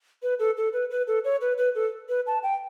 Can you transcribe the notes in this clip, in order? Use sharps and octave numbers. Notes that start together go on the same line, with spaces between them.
B4
A4
A4
B4
B4
A4
C#5
B4
B4
A4
B4
A5
G5